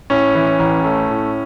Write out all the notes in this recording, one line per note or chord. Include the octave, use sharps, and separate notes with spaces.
A2 C#4
E3
A1
A3
A2